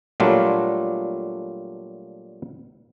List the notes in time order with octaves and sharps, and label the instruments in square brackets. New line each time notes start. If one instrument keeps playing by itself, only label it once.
[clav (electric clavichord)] A#2 F#3 G3 A3 D4 F4